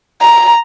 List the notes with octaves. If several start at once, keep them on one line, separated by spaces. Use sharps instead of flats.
A#5